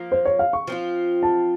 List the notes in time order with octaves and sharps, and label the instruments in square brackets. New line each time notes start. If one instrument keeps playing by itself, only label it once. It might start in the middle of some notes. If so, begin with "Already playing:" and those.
Already playing: [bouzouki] F3 A#3 F4
[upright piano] C5
C#5
F5
C#6
[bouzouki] F3 C4 F4
[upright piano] A5